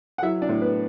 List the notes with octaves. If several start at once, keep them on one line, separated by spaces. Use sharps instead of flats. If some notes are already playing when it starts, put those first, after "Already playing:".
F#5
F#3 E4 E5
D4 D5
A2
B3 B4